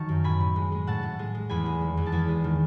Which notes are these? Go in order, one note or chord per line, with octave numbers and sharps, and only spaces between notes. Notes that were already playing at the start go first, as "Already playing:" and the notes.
Already playing: D#3 F#3 A5 C#6
F#2
A2 G#5 B5
A2
G#3
G#3
A2 F#5 A5
A2
G#3
G#3
E2 G#5 B5
G#3
D#3
E2
A5
E2 G#5 B5
G#3
D#3